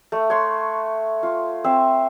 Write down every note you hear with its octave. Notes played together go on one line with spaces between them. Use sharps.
A3
C#5 F#5 C6
F4
C4 C5 E5